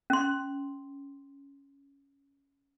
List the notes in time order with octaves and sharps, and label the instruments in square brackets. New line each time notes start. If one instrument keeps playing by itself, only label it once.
[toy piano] C#4 C6